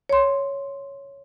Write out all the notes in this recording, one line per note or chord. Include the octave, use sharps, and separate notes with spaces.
C#5 C6